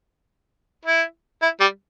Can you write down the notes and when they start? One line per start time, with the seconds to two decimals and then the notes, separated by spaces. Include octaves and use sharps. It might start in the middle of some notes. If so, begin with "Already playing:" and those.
0.85 E4
1.42 E4
1.61 G3